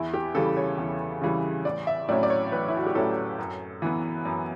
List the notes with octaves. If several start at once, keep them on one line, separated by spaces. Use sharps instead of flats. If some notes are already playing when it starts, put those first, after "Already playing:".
Already playing: E2 E4
G4
C#3 E3 G3 A4
C#5
E2
C#3 E3 G3
A1 D5
E5
A2 F#3 C#4 E4 D5
D5
C#5
A1 B4
E4
F#4
G4
A2 F#3 C#4 E4 A4
F#2
E3 B3
F#2